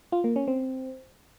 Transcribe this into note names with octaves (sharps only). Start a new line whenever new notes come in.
F4
A#3
C#4
C4